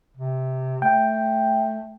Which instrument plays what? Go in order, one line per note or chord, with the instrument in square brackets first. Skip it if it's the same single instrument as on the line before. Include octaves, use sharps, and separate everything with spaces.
[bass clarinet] C3
[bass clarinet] A3 [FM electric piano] G5